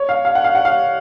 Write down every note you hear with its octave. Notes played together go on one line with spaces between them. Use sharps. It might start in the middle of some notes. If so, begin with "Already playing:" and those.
Already playing: C#5
F5
F5
F#5
F5
F#5
F5